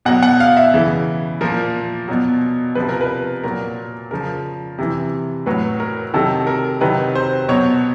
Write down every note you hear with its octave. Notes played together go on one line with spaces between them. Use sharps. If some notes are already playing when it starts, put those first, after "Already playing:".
B2 F#3 F#5
F#5
F5
E5
C#3 E3
A#2 F3 A#4
B2 F#3
C3 F3 B4
A#4
B4
A#2 F#3 A#4
C#3 F3 A#4
C3 E3
A2 F#3 B4
A#4
C3 D#3 F#3 A4
A#4
C3 D#3 F#3 B4
C5
B2 F#3 C#5